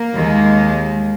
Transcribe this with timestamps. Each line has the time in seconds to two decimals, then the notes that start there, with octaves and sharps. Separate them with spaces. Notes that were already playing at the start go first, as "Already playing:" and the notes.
Already playing: A#3
0.14 D#2 D#3 G#3